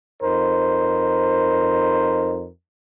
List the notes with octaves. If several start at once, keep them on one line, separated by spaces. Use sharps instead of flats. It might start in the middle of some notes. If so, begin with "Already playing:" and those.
F2 D#4 A#4 C5